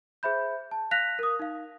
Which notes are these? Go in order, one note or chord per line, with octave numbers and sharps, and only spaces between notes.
G#4 C5 E5 B5 G6
A5
F5 F#6 A#6 B6 F7
A#4 D#6
D#4 F5